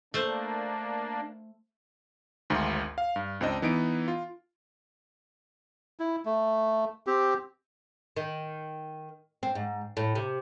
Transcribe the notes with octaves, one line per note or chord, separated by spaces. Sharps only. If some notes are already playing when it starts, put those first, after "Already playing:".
A3 A#3 D4 C5
G#1 D2 G#2
F5
G2
C#2 C4 D4 D#5
E3 B3 D#4 D7
F4
E4
A3
C4 G4
D#3
C4
G#2
A2
C3